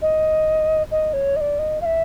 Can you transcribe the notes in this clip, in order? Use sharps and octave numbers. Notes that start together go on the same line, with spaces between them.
D#5
D#5
C#5
D#5
D5
D#5
F5
E5